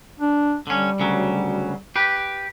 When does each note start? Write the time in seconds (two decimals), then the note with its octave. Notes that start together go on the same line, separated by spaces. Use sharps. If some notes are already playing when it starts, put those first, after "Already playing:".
0.20 D4
0.67 D3 G3 C#4
1.00 D2 C#3 F#3
1.96 G4 B4